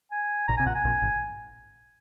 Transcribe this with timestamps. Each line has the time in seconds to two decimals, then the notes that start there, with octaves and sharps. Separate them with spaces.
0.12 G#5
0.48 A#1 A#2 A#5
0.58 C3 G#5
0.66 A#1 A#2 F#5
0.75 G#5
0.85 A#1 A#2
1.02 G#1